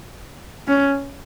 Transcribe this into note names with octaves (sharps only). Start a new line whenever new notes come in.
C#4